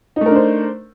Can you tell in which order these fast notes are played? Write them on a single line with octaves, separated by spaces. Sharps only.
D#4 A3 A#4 D4 C5